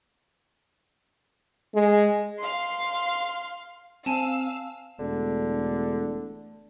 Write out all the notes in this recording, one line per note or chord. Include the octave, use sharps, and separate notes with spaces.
G#3
F5 C6
C4 F5 G#5 A5 E6
E1 D3 A3